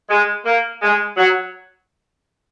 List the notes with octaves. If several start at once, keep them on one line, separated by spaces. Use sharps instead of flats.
G#3
A#3
G#3
F#3